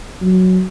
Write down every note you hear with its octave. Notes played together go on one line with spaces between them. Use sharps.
F#3